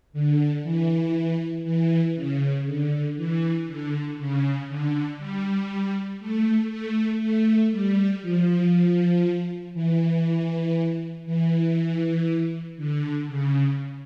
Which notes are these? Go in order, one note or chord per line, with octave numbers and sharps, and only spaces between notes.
D3
E3
E3
C#3
D3
E3
D3
C#3
D3
G3
A3
A3
A3
G3
F3
E3
E3
D3
C#3